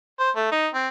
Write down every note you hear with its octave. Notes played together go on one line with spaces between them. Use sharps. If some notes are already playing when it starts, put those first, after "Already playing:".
C5
A3
D#4
C4